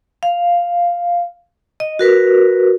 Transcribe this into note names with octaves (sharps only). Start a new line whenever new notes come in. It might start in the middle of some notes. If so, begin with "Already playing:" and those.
F5
D#5
F#4 A#4 B4